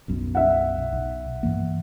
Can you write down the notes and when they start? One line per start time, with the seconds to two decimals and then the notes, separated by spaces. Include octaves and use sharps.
0.08 B1 F#2 B2
0.35 E5 F#5
0.93 B1
1.43 G2 E3 A#3